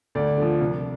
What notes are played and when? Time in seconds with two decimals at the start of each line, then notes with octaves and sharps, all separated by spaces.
0.15 D2 D5
0.38 D3 F3
0.61 C2